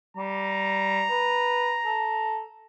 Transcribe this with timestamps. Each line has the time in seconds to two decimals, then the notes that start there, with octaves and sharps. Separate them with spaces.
0.17 G3 A#5
1.10 B4
1.85 A4